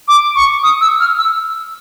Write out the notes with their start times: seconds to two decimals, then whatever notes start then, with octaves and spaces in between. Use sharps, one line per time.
0.08 D6
0.36 C#6
0.63 D#6
0.81 E6
1.00 F6
1.18 E6